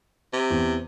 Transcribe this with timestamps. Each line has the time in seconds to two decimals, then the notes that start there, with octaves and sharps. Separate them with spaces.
0.33 C3
0.50 E2